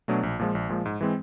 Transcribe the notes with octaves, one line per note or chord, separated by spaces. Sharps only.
B2 F#3 A3 D4
A#1
A#2 F3 G#3
A#1
A#2 F3 G#3
G#2
E3 G#3 C4